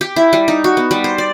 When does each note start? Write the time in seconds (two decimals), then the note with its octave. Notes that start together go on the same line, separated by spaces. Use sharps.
0.01 G4
0.16 E4
0.33 G3
0.48 D#4
0.64 F#4
0.77 B3
0.91 G3
1.04 C5
1.18 D5